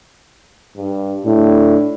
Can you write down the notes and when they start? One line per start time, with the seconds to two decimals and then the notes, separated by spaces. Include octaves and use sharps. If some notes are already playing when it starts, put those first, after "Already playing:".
0.77 G2
1.25 A2 D4